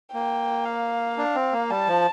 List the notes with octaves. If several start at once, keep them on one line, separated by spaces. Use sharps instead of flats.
A#3 G5
F5
D4
C4
A#3
G3 A5
F3